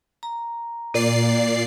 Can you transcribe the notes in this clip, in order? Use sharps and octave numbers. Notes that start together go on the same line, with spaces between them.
A#5
A#2 A#3 D5 C7